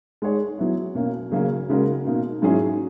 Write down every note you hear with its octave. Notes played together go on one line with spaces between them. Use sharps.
G#3 D#4 G#4 C#5
F#3 B3 E4
B2 A#3 C#4
C#3 F#3 A#3 C#4
C#3 G#3 C#4 F#4 A#4
B2 A#3 D#4
G#2 F#3 C#4 E4 G#4